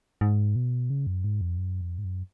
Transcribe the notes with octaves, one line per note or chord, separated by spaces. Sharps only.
G#2
B2
C#3
F#2
G#2
F2
F#2
F2
G#2
F#2